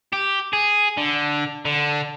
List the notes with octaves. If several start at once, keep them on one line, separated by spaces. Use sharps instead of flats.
G4
G#4
D3
D3